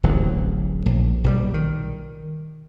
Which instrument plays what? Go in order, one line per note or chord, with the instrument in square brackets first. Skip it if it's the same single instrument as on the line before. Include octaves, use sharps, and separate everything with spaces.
[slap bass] D1 A1 D2 F#3
A#1
B1 A#2 F3 G3
D#3